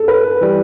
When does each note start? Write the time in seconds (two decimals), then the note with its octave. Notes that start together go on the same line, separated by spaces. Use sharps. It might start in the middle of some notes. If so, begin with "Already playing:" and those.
Already playing: A4
0.08 B4
0.41 E3 G3